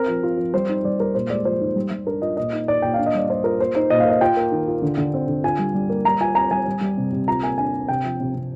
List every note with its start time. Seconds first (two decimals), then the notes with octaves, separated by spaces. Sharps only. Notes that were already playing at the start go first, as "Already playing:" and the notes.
Already playing: C4 A#4
0.08 F3
0.23 F4
0.37 F3
0.54 G3 C5
0.69 D#4
0.84 G3 D5
1.00 G3 A#4
1.15 A#2 C5
1.30 G#3 D5
1.45 F3 C5
1.61 D#4
1.76 G3
1.91 G3
2.07 D4 A#4
2.22 F4 D#5
2.37 A#2 D#5
2.53 D#4
2.68 D#4 D5
2.82 A#2 G5
2.94 D4 F5
3.06 D#5
3.14 G3 D5
3.29 D4 C5
3.44 F4 A#4
3.60 A#3 C5
3.75 D#4 C5
3.90 A#2 D#5
4.00 F5
4.05 A#3 D#5
4.21 F4 G5
4.37 A#3
4.52 D#3
4.68 F4
4.82 D3
4.98 D3
5.14 C4
5.28 D3
5.44 F4 G#5
5.59 G3
5.74 G3
5.90 A#3
6.05 G3 A#5
6.20 F4 G#5
6.35 C4 A#5
6.51 G3 G#5
6.67 G3
6.81 G3
6.97 C3
7.12 C3
7.28 F4 A#5
7.43 A#3 G#5
7.58 D4 G#5
7.74 D4
7.88 C3 G5
8.04 F3
8.20 C3
8.35 C3